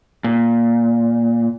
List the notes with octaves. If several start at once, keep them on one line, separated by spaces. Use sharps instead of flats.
A#2